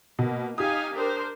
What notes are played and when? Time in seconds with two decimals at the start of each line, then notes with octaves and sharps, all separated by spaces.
0.19 B2 A#3
0.58 D#4 G4 F5 G#5 D#6
0.94 D4 A#4 C5